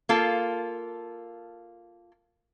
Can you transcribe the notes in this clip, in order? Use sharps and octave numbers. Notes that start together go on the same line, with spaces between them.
A#3 F4 A4